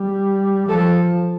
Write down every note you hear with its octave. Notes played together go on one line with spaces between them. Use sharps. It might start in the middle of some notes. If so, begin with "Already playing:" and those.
Already playing: G3
F3 A4